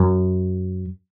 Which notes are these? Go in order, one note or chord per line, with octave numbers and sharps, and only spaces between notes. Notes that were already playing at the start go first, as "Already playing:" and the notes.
Already playing: F#2